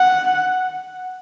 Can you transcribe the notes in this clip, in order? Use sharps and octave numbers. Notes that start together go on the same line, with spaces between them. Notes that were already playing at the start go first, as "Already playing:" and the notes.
Already playing: F#5